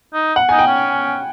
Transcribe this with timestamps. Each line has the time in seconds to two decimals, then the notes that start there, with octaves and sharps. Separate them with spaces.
0.14 D#4
0.36 F#5
0.49 D#4 G#5
0.59 G5
0.67 C#4